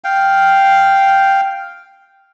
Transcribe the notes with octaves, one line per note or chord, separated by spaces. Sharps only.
F5 G5